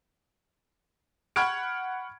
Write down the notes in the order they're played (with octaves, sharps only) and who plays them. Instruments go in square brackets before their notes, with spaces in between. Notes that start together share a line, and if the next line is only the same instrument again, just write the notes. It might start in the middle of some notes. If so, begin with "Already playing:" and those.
[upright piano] F#5 B5 C#6 F6 G#6 D7